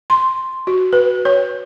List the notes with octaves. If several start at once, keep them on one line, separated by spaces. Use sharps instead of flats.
C6
F#4
B4
C#5